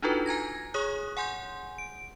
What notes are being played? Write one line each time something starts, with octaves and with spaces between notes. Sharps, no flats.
D4 D#4 F4 F#4 A4 B4
G#5 A#5 G#6 A#6
G#4 C#5 C#6 D#6 F#6
F#5 G#5 C6 G6
D7